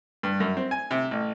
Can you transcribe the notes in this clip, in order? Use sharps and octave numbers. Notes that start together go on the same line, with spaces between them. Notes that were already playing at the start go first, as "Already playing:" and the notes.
G2
F#2
C4
G#5
C3
A1